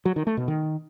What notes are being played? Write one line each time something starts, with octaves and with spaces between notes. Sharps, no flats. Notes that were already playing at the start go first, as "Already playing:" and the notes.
F#3
D#3
A3
B2
D#3